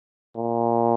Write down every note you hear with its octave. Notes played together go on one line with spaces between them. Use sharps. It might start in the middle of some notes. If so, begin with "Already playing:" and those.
A#2